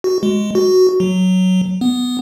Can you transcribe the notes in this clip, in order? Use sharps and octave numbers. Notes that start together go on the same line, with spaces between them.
F#4
G#3
F#4
F#3
B3